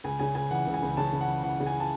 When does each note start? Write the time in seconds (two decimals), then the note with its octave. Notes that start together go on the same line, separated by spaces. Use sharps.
0.04 C#2 G#5
0.19 C#3 G#5
0.35 C#2 G#5
0.51 E3 F#5
0.67 C#2
0.74 G#5
0.83 C#2
0.97 C#3 A5
1.13 C#2
1.21 F#5
1.28 E3
1.43 E3 F#5
1.60 C#3
1.67 G#5
1.80 A5